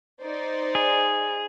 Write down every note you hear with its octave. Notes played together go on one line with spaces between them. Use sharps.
D#4 C5 D5
G#4